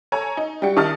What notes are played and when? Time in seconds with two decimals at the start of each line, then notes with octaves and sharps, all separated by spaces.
0.12 A4 C#5 G#5 A#5
0.37 D#4
0.62 G3 F#4 G5 C#7
0.77 D#3 D#4 A5 D#6 F6 A6